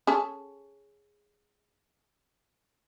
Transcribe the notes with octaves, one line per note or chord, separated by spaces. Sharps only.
C#4 G#4 A4